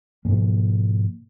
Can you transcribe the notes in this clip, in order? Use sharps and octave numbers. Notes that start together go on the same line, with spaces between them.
G#2 B2 F3 A#3